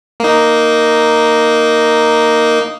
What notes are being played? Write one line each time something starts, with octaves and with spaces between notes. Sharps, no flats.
A#3 D#4